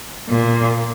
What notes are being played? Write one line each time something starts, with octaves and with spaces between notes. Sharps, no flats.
A#2